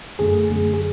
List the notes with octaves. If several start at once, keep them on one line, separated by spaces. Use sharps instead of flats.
F#2 D3 A3 G#4
F#2 D3 A3
G#4